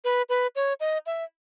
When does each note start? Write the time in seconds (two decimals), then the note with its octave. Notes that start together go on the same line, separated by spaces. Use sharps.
0.04 B4
0.29 B4
0.56 C#5
0.80 D#5
1.06 E5